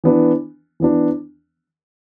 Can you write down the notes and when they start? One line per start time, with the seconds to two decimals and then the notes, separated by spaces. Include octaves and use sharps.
0.04 E3 B3 D4
0.80 E3 B3 D4